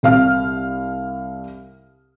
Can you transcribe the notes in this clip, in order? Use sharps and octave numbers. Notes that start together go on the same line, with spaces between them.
C2 F5 F6